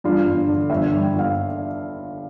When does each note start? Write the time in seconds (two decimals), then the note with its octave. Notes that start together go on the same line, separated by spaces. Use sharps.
0.04 G2 F4
0.26 G1
0.48 D3
0.70 G1 E5
0.92 G2
1.02 G5
1.13 G1
1.19 F5